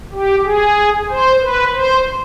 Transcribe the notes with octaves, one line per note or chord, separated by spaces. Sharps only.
G4
G#4
C5
B4
C5